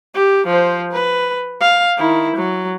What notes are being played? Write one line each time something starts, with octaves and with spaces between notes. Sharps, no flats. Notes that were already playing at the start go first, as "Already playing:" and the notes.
G4
F3 C5
B4
F5
D#3 E4
F#3